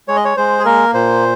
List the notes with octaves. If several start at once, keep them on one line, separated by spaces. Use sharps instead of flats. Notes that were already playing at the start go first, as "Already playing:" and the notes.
G#3 C#5
D#5
C#5
G#3 C5
G#4
A#3 A#4
A#2 C5